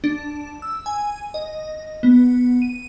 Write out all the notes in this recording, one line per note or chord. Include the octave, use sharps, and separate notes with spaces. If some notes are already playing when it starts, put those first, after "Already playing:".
D4
E6
G#5
D#5
B3
D#7